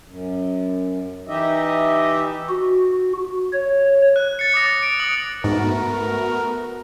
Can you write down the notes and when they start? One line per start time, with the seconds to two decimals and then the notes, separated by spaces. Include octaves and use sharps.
0.07 F#2
1.28 E3 D#4 G4 D#5 E5
2.49 F#4
3.53 C#5
4.16 F#6
4.39 A6 C7 C#7
4.54 D6 D#6 A#6
4.83 D7
4.99 D#6 F#7
5.44 G#2 A3 B3 F#4 A#4